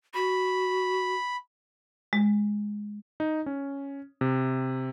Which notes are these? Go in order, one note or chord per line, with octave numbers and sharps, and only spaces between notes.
F#4 B5
G#3
D#4
C#4
C3